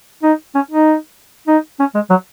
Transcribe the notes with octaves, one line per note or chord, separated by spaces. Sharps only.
D#4
C#4
D#4
D#4
C#4
G#3
F#3